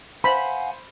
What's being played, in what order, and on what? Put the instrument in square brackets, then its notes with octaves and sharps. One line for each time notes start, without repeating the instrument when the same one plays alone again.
[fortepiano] C5 [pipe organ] F5 F#5 G#5 [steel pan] B5